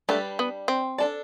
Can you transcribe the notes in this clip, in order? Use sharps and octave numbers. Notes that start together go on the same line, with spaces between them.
G3 A3 D4 G4 B4 D5
B3
C4
D4 A4 D5